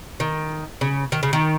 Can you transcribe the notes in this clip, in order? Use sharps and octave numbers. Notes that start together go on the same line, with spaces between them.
D#3
C#3
D#3
C#3
D#3